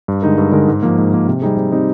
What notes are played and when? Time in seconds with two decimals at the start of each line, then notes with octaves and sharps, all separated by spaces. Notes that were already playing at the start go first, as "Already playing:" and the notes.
0.08 G2
0.22 D3 G#3 D#4 A#4
0.38 G2
0.52 D3 G#3 D#4 A#4
0.68 G#2
0.83 F3 A#3
0.98 G#2
1.13 F3 A#3
1.28 C3
1.42 G3 C4 D#4 G#4
1.57 C3
1.72 G3 C4 D#4 G#4